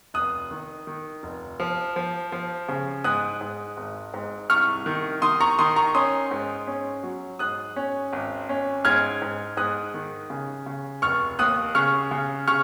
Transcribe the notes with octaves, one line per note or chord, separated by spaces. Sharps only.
F1 D#6 F#6
D#3
D#3
F1
F3
F3
F3
C#3
G#2 D#6 F#6
G#2
G#1
G#2
C2 C#6 F6
D#3
D#3 C6 D#6
A#5 C#6
D#3 C6 D#6
A#5 C#6
C#4 C6 D#6
G#2
C#4
F#3
G#2 D#6 F#6
C#4
G#1
C#4
G#2 F6 G#6
G#2
G#2 D#6 F#6
D#3
C#3
C#3
F1 C#6 F6
D#2 D#6 F#6
C#3 C#6 F6
C#3
C#3 C#6 F6